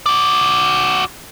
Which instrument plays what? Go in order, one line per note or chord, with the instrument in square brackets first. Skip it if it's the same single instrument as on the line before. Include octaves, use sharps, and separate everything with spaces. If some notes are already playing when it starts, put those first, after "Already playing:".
[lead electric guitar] F#4 D5